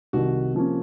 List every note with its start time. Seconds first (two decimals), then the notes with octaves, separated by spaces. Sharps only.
0.13 C2 C3 D#3 F#4
0.55 C3 F3 A#3 C#4